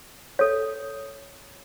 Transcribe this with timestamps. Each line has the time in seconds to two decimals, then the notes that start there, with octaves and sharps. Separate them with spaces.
0.39 A4 C#5